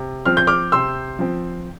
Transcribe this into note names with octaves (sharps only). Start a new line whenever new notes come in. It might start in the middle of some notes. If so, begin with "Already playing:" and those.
Already playing: C3
F3 C4 F6
G6
D6 F6
C3 C6 E6
F3 C4